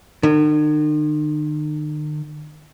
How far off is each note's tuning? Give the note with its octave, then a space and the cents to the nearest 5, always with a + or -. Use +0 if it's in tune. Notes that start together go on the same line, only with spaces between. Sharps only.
D#3 -45